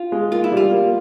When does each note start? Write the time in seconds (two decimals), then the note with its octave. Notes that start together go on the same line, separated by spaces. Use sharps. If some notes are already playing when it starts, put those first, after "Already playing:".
Already playing: F4
0.12 G#3
0.32 A#3 F4
0.44 E4
0.52 G3
0.57 F4
0.71 A#3